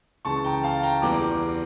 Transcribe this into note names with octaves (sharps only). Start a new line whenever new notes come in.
C#2 C#3 E3 A5 C#6
G5 A#5
F5 A5
G5 A#5
E2 E3 G3 A#5 D6